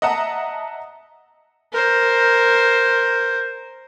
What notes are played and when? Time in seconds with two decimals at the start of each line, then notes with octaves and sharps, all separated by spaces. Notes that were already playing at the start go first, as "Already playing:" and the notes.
0.02 D#5 E5 F#5 A5 A#5 D#6
1.73 A#4 C5